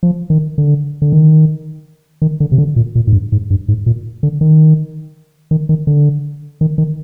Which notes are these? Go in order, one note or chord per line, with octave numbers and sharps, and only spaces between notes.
F3
D#3
D3
D3
D#3
D#3
D3
C3
D3
A#2
A#2
G#2
G2
G#2
G2
G#2
A#2
D3
D#3
D#3
D#3
D3
D#3
D#3